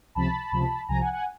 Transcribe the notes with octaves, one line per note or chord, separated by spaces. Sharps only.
C#2 C3 F3 A5 B5
C#2 C3 F3
C2 C3 F3 G#5 A#5
F#5 G#5
F#5 G#5